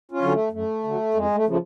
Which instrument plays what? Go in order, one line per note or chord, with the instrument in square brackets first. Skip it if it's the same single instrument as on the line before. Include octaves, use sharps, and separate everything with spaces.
[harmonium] C#4 F4
D3 F#3
A3
F#2 A3
D3 F#3
F2 G#3
A3
C#3 F3 A3